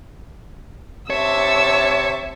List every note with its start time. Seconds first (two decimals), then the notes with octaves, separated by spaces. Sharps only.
1.10 C3 C#5 E5 A5 E6